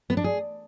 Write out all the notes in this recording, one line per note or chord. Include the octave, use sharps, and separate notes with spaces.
B3
D4
G#4